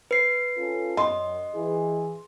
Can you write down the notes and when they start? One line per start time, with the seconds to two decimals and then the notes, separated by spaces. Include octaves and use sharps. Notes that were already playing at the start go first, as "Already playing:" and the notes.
0.11 B4 C7
0.57 C#4 F4 A4
0.97 F#2 D#5 C6
1.54 E3 E4 G#4